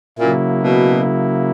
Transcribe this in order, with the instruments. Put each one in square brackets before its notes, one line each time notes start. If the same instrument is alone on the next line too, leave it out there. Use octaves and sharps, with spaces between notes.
[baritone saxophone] A#2 [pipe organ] C#3 F#3 A#3 E4
[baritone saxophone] B2